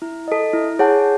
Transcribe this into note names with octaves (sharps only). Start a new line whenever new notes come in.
E4
A4 D#5
E4
G#4 C#5 F#5 A5